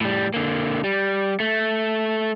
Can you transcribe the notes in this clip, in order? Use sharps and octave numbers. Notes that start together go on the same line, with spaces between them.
A2 G3
D3 A#3
G3
A3